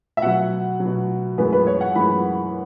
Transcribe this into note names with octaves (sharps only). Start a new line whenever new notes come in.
E5
B2 F#3 F#5
F#3
B2
F#2 E3 G#3 B4
B4
C#5
F#5
F#2 E3 G#3 B5